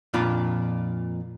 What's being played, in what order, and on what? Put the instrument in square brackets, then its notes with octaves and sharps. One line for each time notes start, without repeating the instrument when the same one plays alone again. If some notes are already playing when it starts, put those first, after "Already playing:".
[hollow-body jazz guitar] F2 A#2 D4 F4 D5 B5